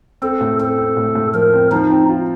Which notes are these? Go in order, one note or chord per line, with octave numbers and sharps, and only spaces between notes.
C4 A4
A2
C4 A4
C4
A2
A2
F3 A#4
C4
F3 D#4
C4
F4